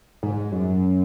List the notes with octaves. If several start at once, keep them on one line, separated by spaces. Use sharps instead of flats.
G#2
F#2